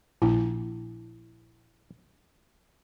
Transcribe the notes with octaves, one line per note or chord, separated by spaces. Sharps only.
A#1 E4